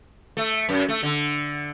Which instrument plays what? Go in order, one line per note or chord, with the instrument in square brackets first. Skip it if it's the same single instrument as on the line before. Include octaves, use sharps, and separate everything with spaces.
[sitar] A3
F#2
A3
D3